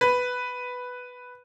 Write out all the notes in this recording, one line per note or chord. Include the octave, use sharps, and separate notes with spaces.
B4